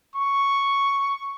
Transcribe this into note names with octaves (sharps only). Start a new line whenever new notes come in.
C#6